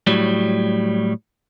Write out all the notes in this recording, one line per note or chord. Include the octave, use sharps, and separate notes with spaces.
A2 F#3 G3